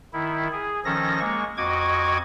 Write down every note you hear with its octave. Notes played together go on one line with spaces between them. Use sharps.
D#3 E4
G#4
D#3 F3 C#4 A4 A#6
G#3 A#3 C#6
F2 F#4 D#5 C#6 D6 G#6